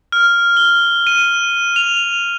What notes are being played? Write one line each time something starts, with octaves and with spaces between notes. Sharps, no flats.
F6
G7
D#7
F7